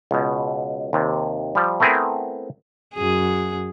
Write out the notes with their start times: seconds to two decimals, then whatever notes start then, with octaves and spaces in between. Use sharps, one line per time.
0.11 C#2 B2
0.93 D#2 C3
1.55 F3 G3
1.80 A3 B3 C4 E4 G#4 A#4
2.95 F#2 G#4